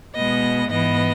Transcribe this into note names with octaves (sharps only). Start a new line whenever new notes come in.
B2 G#3 B3 D#5
G#2 E3 B3 D#5